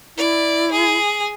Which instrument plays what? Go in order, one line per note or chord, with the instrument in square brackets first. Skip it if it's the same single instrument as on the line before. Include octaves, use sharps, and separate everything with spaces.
[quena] E4 [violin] D5
[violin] G#4